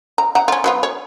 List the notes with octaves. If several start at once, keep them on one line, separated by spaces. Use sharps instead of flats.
A#5
F#5 A#5
C#4 F4
F#3 B3 F4
C#5